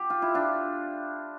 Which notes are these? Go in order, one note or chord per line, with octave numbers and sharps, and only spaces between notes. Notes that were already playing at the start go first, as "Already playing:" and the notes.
Already playing: G4
F4
E4
D4 F4